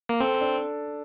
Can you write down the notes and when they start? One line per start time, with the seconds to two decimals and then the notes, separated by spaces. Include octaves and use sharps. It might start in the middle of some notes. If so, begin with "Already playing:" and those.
0.09 A#3
0.20 C4 A4
0.41 D4